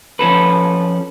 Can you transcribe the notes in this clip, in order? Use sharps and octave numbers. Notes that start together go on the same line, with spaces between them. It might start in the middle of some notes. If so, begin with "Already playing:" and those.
F3 C#4 A4 B4